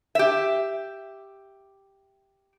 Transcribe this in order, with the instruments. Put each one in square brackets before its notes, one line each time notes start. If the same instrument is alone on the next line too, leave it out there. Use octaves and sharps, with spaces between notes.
[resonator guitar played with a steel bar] G4 E5